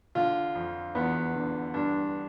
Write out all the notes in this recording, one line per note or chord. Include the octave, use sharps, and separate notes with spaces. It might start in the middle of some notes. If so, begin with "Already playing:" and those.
D3 F4
F2
E2 B3
D3
G2 D4